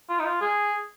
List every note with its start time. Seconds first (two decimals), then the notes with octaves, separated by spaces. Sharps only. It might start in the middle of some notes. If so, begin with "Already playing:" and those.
0.09 F4
0.19 D#4
0.25 F4
0.41 G#4